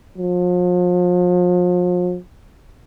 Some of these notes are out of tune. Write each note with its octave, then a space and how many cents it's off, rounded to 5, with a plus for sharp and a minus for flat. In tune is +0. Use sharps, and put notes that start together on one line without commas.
F3 +40